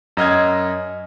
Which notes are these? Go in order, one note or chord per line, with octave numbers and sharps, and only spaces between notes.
F#2 D#5 F6 G#6